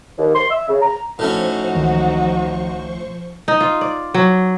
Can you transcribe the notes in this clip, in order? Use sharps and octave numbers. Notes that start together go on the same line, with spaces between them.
D#2
C6
E5
C#3
A#5
A2 F3 A3 C#4 D#4 F#4 C5 C#6
C#2 D#3 E3
D#4
F4
D5
F#3